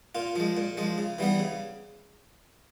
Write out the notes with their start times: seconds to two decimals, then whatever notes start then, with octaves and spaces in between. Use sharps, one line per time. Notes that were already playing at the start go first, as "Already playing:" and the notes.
0.15 A#2 F4
0.36 F3 G#3
0.57 A#2
0.77 F3 G#3
0.98 C#3
1.18 E3 G3 B3
1.39 C#3